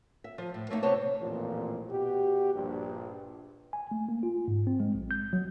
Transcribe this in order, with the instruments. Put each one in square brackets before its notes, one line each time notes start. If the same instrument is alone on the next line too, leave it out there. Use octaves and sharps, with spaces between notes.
[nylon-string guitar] E5
F3
A2
A3 A#3 C#4 D#4
C3 B3 C5 C#5 A5
[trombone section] A1 F2 A#2
B2 F#4 G4
A#1 G2
[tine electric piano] G#5
A3
A#3
F4
G#2
C4
G#3
A#1
G6
F#3